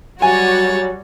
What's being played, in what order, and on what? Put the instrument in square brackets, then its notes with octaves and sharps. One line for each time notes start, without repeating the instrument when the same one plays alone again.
[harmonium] F#3 [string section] G3 F#4 [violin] C#5 A6 [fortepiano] G#5